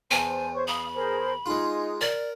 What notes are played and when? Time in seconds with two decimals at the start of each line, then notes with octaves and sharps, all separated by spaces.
0.11 E2 C5 G#5 A5
0.53 C5 C#5 C#6
0.68 F5 B5 D#6
0.95 G#4 A#4 C5
1.46 G#3 D#4 F4 G#4
2.01 A#4 D5